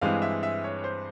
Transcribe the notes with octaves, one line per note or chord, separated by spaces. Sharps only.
G2 E3 G#3 C4 F5
E5
E5
C#5
C#5
C5